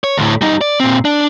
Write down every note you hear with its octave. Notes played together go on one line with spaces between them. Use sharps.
C#5
D2 A2
G3 D#4
D5
A#2 C4
D4